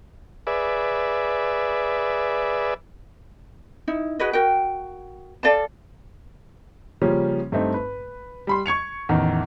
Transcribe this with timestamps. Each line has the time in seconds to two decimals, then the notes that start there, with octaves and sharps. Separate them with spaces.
0.47 G#4 B4 D5 E5
3.88 D#4 E4
4.19 F#4 G#4 B4 D#5
4.33 F#4 A#4 G5
5.43 A4 D5 F5 A5
7.02 C#3 F3 G3 A#3 C#4
7.52 G2 A3 C4 D#4
7.74 B4
8.47 G3 B5 C6
8.66 C#6 G#6 C#7 F7
9.09 A1 E2 D#3